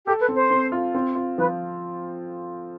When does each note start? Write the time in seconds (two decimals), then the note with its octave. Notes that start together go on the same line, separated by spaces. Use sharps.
0.07 G4 A4
0.21 B4
0.28 C4
0.36 C5
0.50 C4
0.72 F4
0.95 C4
1.15 F4
1.38 F3 B4